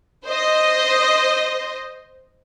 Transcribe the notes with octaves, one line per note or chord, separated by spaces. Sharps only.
C5 D#5